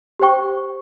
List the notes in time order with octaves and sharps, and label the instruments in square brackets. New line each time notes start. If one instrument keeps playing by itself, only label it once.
[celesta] G4 C5 G5 C#6